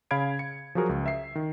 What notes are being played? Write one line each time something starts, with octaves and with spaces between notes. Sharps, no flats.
C#3 F5 B5 G#6 D7
C#7
F3 F#3 F#4 G#4 A#4
C#2
E5 C7
D#3